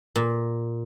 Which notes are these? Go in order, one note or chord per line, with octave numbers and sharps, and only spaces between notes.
A#2